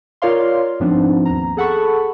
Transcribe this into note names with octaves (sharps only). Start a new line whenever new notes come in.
F4 A#4 C#5 D5 F5 C6
G#2 F3 B3 C4 D4 D#4
D#2 A#5
G#4 A4 F#5 A5 B5 C#6